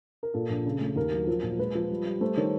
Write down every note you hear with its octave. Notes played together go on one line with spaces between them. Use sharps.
A#4
A#2 A4
A#1
C#3
A3
D#2 A#4
F#3
F3
A#2
G#3 B4
F3
G3
G3
A3 C5
D#3 C#5